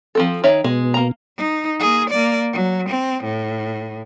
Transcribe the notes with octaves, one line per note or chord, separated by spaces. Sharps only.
F3 C4 A4
D#3 C#5 E5
B2 G#3
A#3 A#5
D#4
A#3 G#4
A#3 D5
F#3
C4
A2